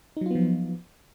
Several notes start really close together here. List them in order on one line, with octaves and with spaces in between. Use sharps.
D#4 F#3 F4 B3 F3